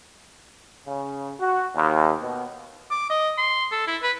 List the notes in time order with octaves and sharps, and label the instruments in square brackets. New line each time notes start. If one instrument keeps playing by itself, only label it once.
[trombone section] C#3
F#4
D#2
B2
[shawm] D6
D#5
C6
A4
E4
B4